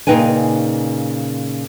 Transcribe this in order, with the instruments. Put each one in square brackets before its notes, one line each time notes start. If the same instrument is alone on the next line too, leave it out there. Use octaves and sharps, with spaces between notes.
[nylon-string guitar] A#2 C#3 D#4 B4 G5 G#5